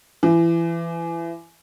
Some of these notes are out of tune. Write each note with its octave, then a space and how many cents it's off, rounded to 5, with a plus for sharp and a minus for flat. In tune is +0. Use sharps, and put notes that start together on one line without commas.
E3 +25